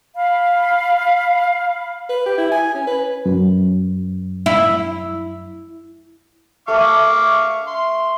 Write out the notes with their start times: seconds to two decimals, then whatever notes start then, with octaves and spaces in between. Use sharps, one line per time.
0.16 F5 B5
2.09 B4
2.26 G4
2.37 E4
2.51 G#5
2.74 C#4
2.87 B4
3.26 F#2
4.46 E4
6.68 A3 E5 F5 C#6 D6
7.67 C6